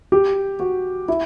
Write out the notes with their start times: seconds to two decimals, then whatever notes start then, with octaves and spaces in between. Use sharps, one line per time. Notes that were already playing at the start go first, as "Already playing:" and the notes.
0.12 G4
0.60 F#4
1.08 E4